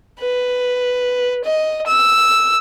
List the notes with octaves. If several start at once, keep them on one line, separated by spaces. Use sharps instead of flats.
B4
D#5
E6